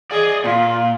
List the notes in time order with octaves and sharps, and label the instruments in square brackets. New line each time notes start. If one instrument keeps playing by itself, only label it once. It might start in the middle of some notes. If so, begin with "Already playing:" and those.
[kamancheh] G#4 [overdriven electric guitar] D5 D#5
[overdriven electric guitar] A#2 [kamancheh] F4